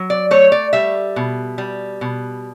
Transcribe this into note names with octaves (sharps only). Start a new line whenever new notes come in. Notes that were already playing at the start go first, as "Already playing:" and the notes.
Already playing: F#3
D5
A3 C#5
D5
G3 E5
B2
G3
B2